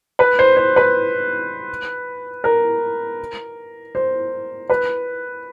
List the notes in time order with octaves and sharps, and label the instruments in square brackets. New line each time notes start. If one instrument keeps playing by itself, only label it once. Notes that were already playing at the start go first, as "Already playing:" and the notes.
[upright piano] B4
C5
C5
B4
A#4
C5
B4